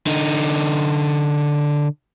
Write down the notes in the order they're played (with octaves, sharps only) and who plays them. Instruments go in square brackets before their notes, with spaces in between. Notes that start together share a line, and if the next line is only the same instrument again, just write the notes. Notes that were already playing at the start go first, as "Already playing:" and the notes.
[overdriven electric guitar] D3 D#4